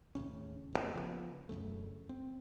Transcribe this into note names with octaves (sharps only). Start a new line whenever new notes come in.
D#2 A2 C#3 C#4
F#1 B2 A#3
C#3 F3 G3 B3
E1 F#2 C#3 A3
C4